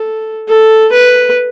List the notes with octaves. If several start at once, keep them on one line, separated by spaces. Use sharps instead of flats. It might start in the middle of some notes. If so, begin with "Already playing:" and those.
Already playing: A4
A4
B4